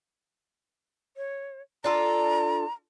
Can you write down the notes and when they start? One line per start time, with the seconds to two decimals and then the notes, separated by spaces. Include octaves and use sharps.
1.17 C#5
1.84 D4 F4 A4 A#5